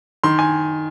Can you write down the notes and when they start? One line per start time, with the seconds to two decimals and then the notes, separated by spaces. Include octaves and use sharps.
0.24 D#3 C6
0.39 G#5